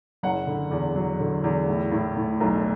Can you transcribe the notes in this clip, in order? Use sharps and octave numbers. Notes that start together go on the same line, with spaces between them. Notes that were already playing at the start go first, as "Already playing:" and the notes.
F#1 F#5
D3
E2
F#3
D3
E2
A2
A2
A2
B1